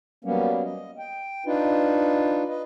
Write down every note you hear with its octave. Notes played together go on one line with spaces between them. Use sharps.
F#3 G3 A#3 B3 C#4
D#5
G5
D4 D#4 F4 B4
B4 D#5